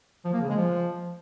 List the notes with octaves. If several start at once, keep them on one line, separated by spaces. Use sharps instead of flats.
F3
A#3
C#3
G#3
F3